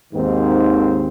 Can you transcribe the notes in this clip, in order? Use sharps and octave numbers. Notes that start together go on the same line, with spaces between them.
D#2 G#2 D#3 C4